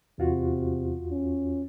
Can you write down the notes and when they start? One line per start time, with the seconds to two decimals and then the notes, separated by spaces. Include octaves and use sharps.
0.19 E2 C3 F4 F#4
1.11 C#4